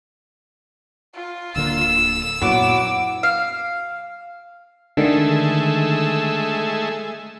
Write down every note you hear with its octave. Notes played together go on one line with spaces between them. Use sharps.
F4
D1 D3 A#3 E6
F#2 A#2 F#3 B3 E4 D6
F5
D3 D#3 G#3 A3 E5